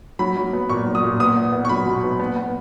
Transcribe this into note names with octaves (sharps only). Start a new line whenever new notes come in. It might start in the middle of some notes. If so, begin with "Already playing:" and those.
F#3 B5
F#3
B3
A#2 C#6
F#3
D#6
A#2
B3 D#6
B3
B3
C#6
F#3 B5
B2
B3
B3
B3